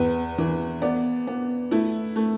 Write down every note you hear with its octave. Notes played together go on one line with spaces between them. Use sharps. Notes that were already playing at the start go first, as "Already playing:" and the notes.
Already playing: E2 B4
E3
B3 D5
B3
A3 E4
A3